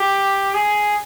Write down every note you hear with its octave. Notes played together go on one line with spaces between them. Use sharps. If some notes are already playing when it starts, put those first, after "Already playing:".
Already playing: G4
G#4